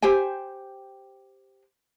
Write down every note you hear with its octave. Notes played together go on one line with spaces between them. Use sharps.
G4 C5 G5 G#5